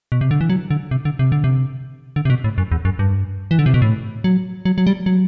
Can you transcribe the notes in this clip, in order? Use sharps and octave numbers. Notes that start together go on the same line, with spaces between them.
B2
C3
D3
E3
F#3
D3
C3
D3
C3
D3
C3
D3
C3
B2
A2
F#2
E2
F#2
G2
E3
D3
C3
B2
A2
F#3
F#3
F#3
G3
F#3